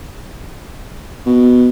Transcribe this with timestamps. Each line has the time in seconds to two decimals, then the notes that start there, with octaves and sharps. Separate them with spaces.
1.26 B2